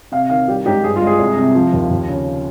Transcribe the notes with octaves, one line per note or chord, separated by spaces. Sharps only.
C3 F5
D#3 F5
G3 G4
G#2 G4
G2 G#4
F4
G#3 G#4
C2
C3
F3
D#2
D#2
C#3